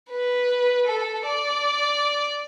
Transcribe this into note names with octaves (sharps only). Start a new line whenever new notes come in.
B4
A4
D5